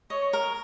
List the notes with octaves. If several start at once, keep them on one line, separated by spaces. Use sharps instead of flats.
C#5 D#5
A#4